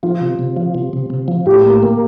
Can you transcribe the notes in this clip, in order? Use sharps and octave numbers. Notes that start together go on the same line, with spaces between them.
F3 F4
C3
C3
F3
C3
C3
C3
F3
A2 G4
A#3
A#3